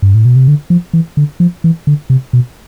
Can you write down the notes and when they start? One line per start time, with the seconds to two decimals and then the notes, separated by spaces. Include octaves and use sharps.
0.02 G2
0.15 A2
0.25 B2
0.36 C3
0.48 D3
0.70 F3
0.93 E3
1.17 D3
1.40 F3
1.64 E3
1.87 D3
2.10 C3
2.33 B2